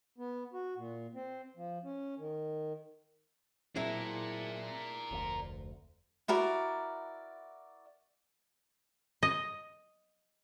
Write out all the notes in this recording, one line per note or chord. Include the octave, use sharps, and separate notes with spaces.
B3
F#4
A#2
C4
F3
C#4
D#3
A#2 F#3 C4 D4 E4 G#4 A#4 D5
F1 D2
E4 F#4 A#4 D5
D#5